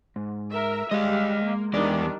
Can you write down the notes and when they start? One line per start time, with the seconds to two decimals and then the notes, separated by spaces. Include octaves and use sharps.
0.16 G#2
0.50 A#4 E5
0.91 G3 G#3 D#5 F5
1.45 A#3
1.73 E2 D#3 G3 D4 D5